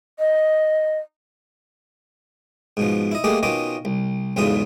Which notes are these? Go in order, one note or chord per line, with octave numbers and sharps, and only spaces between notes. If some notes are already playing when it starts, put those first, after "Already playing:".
D#5
G#2 B2 F3
E4 D#5
A3 A#3 G4 G#4 D#5
B2 D#3 C#4 F4 D#5 D6
C2
B1 E2 G#2 C#3 F4 D#6